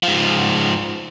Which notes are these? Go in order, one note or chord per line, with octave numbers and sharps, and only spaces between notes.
G#2 F3